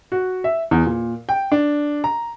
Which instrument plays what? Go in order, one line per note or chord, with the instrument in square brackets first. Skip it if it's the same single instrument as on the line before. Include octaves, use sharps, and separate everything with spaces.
[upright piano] F#4
E5
E2
A#2
G5
D4
A#5